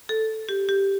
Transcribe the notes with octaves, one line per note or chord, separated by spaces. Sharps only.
A4
G4
G4